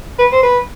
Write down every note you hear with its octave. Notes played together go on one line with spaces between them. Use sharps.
B4
C5
B4